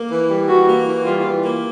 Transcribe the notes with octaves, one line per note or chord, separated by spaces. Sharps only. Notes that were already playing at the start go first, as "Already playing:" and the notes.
Already playing: A#3
E3
G3
E3 F#4
A#3
E3
G3 F4
E3
A#3